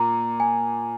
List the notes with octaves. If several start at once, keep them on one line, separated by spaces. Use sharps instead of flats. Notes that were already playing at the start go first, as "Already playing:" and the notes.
Already playing: A#2 A#5
G#5